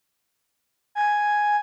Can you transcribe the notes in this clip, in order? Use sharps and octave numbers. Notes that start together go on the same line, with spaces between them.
G#5